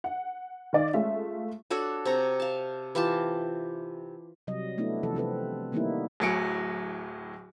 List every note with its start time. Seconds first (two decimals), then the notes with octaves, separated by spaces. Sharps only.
0.04 F#5
0.73 D#3 D5 D#5 F5
0.93 G#3 A3 C#4 F4 E5 F5
1.70 D4 F#4 A4 C#5
2.05 C3 C#5 A#5
2.40 F5 A5
2.95 E3 F4 G4 A5
4.47 C3 F#3 G3 D#5
4.78 A3 B3 D4 E4
5.03 C3 E3 F3 A4
5.15 C3 C4 A4 B4
5.72 D#3 G3 A#3 B3 D#4 E4
6.20 D1 A2 F#3 G#5 C#7 D7